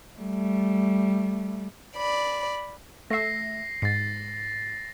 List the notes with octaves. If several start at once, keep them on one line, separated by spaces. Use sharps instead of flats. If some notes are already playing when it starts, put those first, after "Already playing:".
G3 A3
D5 B5
A3 E5 A#6 C7
G#2 A6 C7